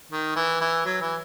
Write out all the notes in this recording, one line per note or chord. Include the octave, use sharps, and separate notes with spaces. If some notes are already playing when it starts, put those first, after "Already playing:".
D#3
E3
E3
F#3
E3